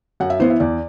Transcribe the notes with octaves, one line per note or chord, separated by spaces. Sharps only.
F#2 F#5
E5
E3 B3 E4 C5
E5
E2 D5